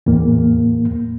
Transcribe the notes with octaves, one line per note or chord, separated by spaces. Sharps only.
E2 A2 A#3